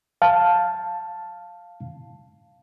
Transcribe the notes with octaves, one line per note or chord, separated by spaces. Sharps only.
F5 A5